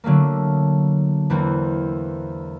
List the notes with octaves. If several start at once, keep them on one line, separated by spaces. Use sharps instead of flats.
D3 F#3 A3 A#3
E2 E3 A#3 C4